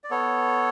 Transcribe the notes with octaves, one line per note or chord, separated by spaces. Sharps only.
D5
B3 A4 C#5